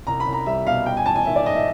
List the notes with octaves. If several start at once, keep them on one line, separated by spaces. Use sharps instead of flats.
C2 A#5
B5
C2
A#5
G3 E5
B2 F5
G3 G5
G#5
A1 A5
G#5
D#3 E5
D5
G#2 D#5
E5